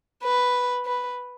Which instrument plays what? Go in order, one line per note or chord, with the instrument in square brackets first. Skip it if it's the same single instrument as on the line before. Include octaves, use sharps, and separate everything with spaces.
[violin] B4
B4